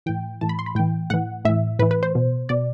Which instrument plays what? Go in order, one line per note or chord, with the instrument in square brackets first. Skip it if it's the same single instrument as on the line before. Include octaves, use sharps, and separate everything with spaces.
[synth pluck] A2 E3 G5
A2 E3 A5
B5
C6
B5
A2 E3 G5
A2 E3 F#5
A2 E3 E5
A2 B4
E3
B4
C5
B2
B2 D5